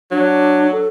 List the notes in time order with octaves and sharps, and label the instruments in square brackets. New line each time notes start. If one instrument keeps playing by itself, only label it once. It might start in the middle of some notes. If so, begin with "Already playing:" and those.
[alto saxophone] F#3 [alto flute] D4
[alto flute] A4